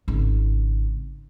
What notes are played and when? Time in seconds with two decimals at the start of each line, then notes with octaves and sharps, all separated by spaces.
0.08 G#1 C#3